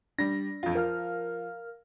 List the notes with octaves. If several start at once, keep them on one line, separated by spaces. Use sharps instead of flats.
G3 D4 A#6
F2 F4
F3 A#4 F5 F6